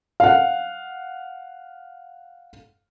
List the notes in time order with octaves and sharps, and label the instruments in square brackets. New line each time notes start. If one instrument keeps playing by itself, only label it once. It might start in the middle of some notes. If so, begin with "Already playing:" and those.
[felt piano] F5 F#5